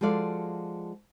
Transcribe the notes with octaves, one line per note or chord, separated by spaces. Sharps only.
F3 G#3 F#4 A4 D5 F5